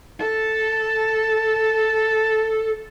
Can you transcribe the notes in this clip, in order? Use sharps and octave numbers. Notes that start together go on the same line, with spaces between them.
A4 A5